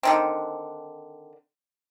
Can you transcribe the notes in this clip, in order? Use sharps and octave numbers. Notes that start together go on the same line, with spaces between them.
D3 D#3 C4